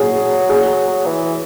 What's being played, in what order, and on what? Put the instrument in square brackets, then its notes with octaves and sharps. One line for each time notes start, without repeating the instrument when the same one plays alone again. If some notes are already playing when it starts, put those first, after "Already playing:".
Already playing: [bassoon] F#3 [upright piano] G#4
[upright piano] G#4
[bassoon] E3